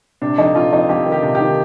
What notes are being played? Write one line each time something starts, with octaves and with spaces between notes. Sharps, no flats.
C3 D4
F2 D#4
F2 F4
F2 D#4
F2 G4
D#3
G4
C3
G4
D#3